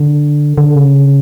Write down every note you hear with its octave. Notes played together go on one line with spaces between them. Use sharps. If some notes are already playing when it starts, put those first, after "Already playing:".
Already playing: D3
D3
C#3